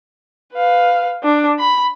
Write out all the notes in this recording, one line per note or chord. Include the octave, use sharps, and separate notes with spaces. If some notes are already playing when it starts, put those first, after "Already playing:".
B4 F5
D4
B5